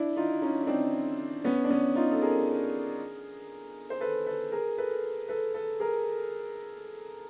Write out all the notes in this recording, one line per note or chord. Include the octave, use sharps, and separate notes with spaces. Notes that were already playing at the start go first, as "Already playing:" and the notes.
Already playing: D4 E4
D#4 F4
C#4 D#4
D#4
C4 D4
B3 C#4
D4
B3 C#4
D#4 F4
A4
G#4 A#4
C5
A4 B4
A4 B4
G#4 A#4
A4 B4
A4 B4
A4 B4
G#4 A#4